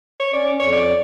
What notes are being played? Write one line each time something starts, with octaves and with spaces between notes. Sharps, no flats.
C#5
C#4 D5
F2 C#5
D5